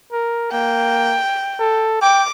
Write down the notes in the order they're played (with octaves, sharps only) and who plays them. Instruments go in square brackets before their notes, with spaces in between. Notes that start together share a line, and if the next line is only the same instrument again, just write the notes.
[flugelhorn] A#4
[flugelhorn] A#3 [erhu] G5
[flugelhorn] A4
[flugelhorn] G5 [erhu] D6